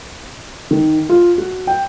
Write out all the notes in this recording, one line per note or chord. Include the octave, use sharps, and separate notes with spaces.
D#3
F4
F#4
G5